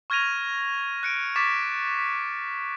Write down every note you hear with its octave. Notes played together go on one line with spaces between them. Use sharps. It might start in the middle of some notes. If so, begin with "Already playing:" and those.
C#6 F6 G#6 A#6 D#7 F7
F#6 C#7 D7
C#6 D6 A6 B6 E7
B6